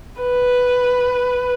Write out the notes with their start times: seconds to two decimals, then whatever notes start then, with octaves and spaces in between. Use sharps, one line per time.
0.21 B4